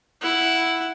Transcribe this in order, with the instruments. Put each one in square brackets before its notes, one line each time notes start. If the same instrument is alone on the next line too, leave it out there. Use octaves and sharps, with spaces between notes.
[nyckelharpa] E4 F#5